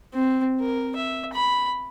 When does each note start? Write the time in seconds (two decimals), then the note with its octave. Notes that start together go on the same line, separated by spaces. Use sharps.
0.14 C4
0.60 A#4
0.96 E5
1.33 B5